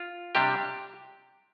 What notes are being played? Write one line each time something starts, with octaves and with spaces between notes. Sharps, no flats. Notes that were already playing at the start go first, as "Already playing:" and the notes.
Already playing: F4
C3 G3 D4 G4